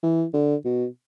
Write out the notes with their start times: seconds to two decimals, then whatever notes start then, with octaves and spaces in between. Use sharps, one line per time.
0.03 E3
0.34 D3
0.65 B2